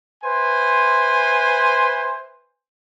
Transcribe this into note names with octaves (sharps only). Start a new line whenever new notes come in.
B4 C5 E5 G#5 C6